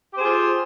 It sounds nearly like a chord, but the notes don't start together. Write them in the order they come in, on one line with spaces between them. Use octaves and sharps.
G4 C5 G#4 F4